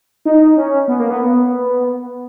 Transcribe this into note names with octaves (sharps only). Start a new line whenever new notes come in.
D#4
C#4
B3
A#3
B3